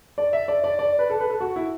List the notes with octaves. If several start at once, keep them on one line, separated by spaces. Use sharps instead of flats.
D5
E5
D5
D5
D5
B4
A4
B4
A4
F#4
E4